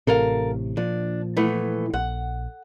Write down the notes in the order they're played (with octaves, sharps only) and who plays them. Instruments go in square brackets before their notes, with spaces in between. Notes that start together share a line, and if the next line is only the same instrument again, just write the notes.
[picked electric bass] A1 A2 C3 [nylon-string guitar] A4 A#4 F5
[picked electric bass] A#2 F3 [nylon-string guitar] D4
[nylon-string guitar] E3 A3 B3
[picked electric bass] A#1 [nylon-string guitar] F#5